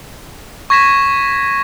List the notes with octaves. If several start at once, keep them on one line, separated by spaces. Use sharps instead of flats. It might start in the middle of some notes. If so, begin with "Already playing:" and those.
C#6 G#6 A#6 B6 E7